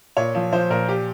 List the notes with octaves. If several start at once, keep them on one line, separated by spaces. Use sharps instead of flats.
A#2 C#5
F3
F3 C5
A#2 A#4
G4